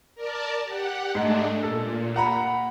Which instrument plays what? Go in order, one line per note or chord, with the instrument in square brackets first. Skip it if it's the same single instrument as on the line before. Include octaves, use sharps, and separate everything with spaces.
[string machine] A#4 D5 A5
G4 F#5
[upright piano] G#2 [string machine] G#3 A3 D4
[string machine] A#2 [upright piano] A4
[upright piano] F#5 A#5 B5